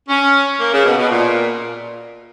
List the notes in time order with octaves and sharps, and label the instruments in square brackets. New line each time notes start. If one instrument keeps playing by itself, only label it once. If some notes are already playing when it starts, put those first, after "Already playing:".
[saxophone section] C#4
A#3
C#3
B2
B2
A#2